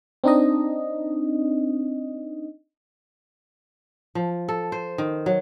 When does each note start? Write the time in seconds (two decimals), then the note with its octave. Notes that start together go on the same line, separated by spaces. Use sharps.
0.24 C4 D4 D#4 D#5
4.15 F3
4.48 A4
4.72 C5
4.98 D#3
5.26 F#3